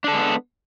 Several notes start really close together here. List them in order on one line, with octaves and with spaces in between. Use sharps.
D4 A4 G#3 B3